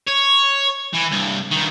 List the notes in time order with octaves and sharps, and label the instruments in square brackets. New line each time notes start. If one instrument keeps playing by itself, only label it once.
[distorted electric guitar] C#5
E3
C2 G2
G2 D#3